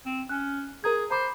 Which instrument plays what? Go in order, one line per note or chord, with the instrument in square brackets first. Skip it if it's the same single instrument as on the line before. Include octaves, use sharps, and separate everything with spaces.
[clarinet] C4
[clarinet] C#4 [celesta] F#6
[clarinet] G#4 [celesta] A#4 A#5 G#6
[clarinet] C5 [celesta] A#5 B5 D6